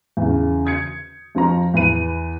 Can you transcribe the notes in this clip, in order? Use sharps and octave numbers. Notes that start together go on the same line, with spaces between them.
E2 C#3
D#6 G#6 C#7
F2 F3 F5 A#5
E2 B4 D#7